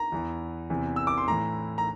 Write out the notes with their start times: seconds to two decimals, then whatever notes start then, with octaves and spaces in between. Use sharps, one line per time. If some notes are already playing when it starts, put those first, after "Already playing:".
Already playing: A#5
0.12 E2 E3
0.70 E2 C3 E3
0.96 E6
1.07 D6
1.18 C6
1.28 A2 E3 A#5
1.78 A#5